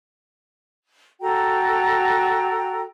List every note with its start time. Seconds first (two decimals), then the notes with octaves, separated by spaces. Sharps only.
1.21 F#4 A4 G5 A#5